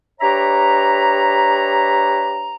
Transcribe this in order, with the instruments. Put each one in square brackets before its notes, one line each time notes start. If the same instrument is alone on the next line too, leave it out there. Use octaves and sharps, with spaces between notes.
[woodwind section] D4 G4 B4 C#5 E5 A#5